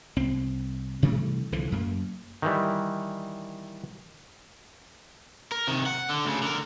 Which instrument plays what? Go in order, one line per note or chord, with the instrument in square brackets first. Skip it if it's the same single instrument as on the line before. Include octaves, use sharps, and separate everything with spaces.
[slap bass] C2 C4
C3 E3 G3 A3
C2 D3 E3 F3
F#2 A#3
[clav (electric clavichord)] D#3 E3 G3
[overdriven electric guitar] A#4
C3 D#3
F#5
D3
D2 C#3
D3 A#4